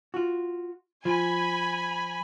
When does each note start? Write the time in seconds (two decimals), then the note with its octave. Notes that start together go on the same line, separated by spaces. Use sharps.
0.14 F4 F#4
1.05 F3 G#5 B5